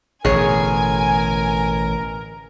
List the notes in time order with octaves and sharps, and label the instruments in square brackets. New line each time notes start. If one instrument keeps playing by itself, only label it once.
[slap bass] A1 B2 D3 [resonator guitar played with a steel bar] G#4 C#5 [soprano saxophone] A#4 [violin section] G#5